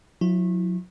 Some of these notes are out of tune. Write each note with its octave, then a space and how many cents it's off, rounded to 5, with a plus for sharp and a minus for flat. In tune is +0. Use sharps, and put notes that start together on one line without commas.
F#3 -35 E4 +0